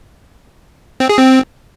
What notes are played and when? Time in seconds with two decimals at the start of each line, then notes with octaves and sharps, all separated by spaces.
1.00 C4
1.09 G#4
1.19 C4